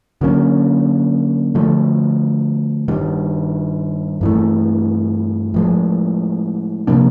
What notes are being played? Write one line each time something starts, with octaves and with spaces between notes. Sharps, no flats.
D3 F#3 A#3 C#4
D3 F3 A3
G2 D#3 G3
G2 E3 A3
A2 F3 G#3
C3 F3 A#3 D4